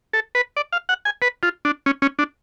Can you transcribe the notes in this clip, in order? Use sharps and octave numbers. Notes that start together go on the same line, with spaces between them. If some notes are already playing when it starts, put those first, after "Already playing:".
A4
B4
D5
F5
F#5
G#5
B4
F4
D4
C#4
C#4
D4